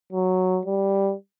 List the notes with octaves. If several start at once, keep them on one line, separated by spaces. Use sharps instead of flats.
F#3
G3